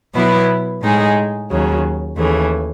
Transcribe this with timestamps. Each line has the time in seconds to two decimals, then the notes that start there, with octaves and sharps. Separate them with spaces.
0.15 B2 F#3 B3 E4 B4
0.82 A2 G#3 D#4 G#4
1.50 D#2 C#3 F#3
2.17 D#2 C#3 E3 A3